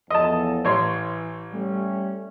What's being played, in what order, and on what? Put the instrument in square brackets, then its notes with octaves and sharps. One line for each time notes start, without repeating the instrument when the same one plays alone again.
[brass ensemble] E2 F3 A4 [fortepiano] D#5 A5
[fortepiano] A1 C#5 C6 [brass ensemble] E3
[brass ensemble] G3 A3 C#4